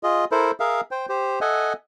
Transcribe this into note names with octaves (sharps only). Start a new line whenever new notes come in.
F4 G#4 D#5
E4 A4 A#4 C5
G#4 A#4 E5 F5
C5 G5
G4 C5
A4 D#5 E5 F#5 G#5